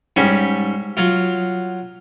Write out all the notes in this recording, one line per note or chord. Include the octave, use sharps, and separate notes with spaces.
G#2 G3 C#4
F#3 F4